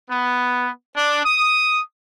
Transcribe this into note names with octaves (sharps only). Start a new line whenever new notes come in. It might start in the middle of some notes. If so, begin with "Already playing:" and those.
B3
D4
D#6